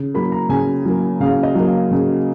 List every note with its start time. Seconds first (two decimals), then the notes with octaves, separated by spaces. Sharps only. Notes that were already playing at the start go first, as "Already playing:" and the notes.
Already playing: C#3
0.14 F#3 A#3 B5
0.32 A#5
0.49 C#3 G#5
0.85 F#3 A#3
1.20 C#3 F5
1.43 D#5
1.55 F#3 A#3
1.67 F5
1.91 C#3